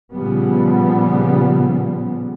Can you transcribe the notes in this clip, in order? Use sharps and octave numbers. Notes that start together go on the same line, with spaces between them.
A#2 C#3 F3 G3 B3